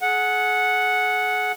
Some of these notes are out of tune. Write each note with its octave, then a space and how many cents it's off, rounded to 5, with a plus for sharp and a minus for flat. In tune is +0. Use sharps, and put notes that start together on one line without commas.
G#4 +30 F#5 -5